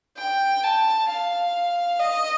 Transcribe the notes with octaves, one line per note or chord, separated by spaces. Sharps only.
G5
A5
F5
D#5